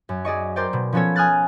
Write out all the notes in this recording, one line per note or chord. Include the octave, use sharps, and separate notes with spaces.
F#2
G#4 D5 D#5 C#6
A#4 C5 D5 G5
B2
F3 B3 C#4 A4 C#5
G#5 D#6 F6 F#6 A6